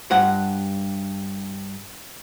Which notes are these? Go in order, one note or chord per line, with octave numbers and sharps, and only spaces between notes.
G2 F#5